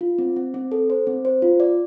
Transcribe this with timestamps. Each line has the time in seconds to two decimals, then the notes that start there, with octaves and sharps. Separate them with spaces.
0.01 F4
0.19 C4
0.36 C4
0.54 C4
0.72 A4
0.90 C5
1.07 C4
1.25 C5
1.42 F4
1.60 D5